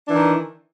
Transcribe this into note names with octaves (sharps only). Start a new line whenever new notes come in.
D#3 E3 D4